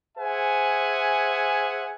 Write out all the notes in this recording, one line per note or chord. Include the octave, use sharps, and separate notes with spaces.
G#4 C5 E5 F#5 G#5